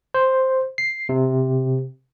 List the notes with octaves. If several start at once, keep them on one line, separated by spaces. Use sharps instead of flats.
C5
C7
C3